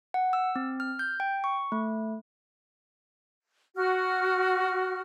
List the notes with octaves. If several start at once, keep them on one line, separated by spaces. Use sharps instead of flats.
F#5
E6
C4
F6
G6
G5
C#6
A3
F#4 F6